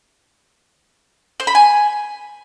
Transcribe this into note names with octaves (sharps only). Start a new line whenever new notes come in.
C5
B5
G#5